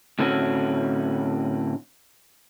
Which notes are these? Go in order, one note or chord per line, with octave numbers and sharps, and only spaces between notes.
A2 D3 C4 C#4 F#4